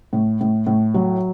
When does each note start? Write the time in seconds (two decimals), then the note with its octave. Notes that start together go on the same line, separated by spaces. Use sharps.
0.13 A2
0.41 A2
0.67 A2
0.94 F#3